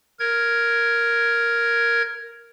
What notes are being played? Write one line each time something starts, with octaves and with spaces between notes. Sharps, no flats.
A#4 G#6